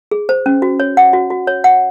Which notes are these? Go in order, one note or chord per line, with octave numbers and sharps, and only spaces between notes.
G#4
C5
C#4
F#4
C#5
F#5
F#4
F#4
C#5
F#5